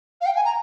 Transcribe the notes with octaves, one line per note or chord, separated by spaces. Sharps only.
F5
G5
G#5
A#5